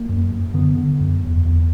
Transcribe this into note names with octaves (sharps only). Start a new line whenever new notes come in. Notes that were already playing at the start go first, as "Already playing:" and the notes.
Already playing: A#3
F#2
F#2
D3 B3
D3
F#2
E2
E2